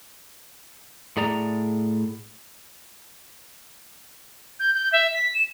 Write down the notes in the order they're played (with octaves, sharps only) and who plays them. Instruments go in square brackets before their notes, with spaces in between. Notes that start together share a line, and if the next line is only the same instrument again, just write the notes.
[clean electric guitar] A2 G#4 D5 A#5
[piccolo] G6
G6
E5
B6
E7